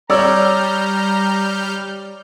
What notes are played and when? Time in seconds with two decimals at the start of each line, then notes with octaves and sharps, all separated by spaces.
0.10 G3 C#5 D5 A#5 E6 F6 G6